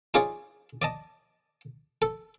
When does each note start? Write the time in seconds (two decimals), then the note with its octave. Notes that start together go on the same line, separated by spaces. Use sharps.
0.14 D#4 F4 G#4 C#5 D5
0.82 D5 D#5 A5
2.02 A4